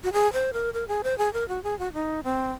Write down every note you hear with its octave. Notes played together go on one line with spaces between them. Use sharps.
F#4
G#4
C5
A#4
A#4
G#4
C5
G#4
A#4
F#4
G#4
F#4
D#4
C4